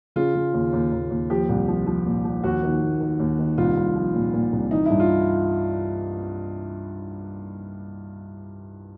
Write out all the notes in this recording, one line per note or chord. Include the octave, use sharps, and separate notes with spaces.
C#3 F4
C#3
D#2
D#2
D#2
D#2
F3 G4
C2
F3
F3
A#2
F3
D#2 F#4
D#3
D#2
D#3
D#2
D#3
C2 F4
C2
F3
A#2
A#2
C2
E3 D#4
G2 E4
F4